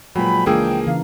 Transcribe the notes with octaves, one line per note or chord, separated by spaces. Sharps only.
A#2 F3 F#3 G#3 B4 G5 G#5 B5
C#2 E3 F3 A#3 D4 G#4 G5 E6
C#3 E3 A#4 F5